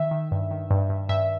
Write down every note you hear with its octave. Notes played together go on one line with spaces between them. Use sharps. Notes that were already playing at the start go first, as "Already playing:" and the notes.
Already playing: D#3 E5
D#3
G2
D#3
G2
G2
G2 E5